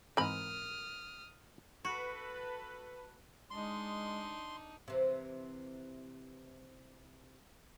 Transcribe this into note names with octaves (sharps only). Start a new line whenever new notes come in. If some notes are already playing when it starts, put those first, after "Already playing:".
G#2 E3 C4 A#4 B5 D#6 F6
F#4 A4 B4
G#3 D4 D#4 C6
C3 E3